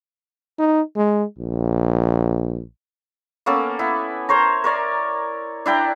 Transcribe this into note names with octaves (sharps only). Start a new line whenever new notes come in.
D#4
G#3
A#1
A#3 B3 C#4 A4
B3 E4
A#4 C5 C#5 A#5
A#4 C#5 D5
D4 E4 G5 A#5